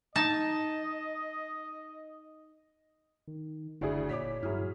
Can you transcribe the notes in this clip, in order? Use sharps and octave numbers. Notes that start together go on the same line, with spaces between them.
D#4 D#5 A5
D#3
F#1 D2 D4 E4 G#4
A#2 C#5 D6 B6
G2 F#3 E4 G#4 F6